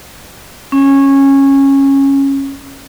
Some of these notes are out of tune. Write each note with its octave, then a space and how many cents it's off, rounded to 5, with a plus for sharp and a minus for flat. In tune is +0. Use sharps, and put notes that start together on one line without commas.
C#4 -15